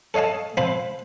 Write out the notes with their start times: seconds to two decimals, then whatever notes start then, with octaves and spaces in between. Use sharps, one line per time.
0.14 A4 C#5 D#5 F5 A5
0.57 F3 C4 F4 C5 B5